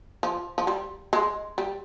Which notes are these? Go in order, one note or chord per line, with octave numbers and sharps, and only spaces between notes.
F3
F3
G3
G#3
G3